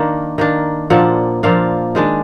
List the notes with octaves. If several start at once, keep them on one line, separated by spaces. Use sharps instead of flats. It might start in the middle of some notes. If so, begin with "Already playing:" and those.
Already playing: D#3 A#3 D4
D#3 A#3 D4
A#2 F3 A#3 D4 F#5
A#2 F3 A#3 D4 F5
D#3 G#3 D4